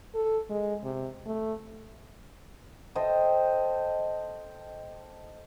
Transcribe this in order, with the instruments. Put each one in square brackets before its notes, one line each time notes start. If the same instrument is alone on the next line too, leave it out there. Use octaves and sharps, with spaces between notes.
[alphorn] A4
G#3
C3
A3
[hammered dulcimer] A4 C5 D#5 G5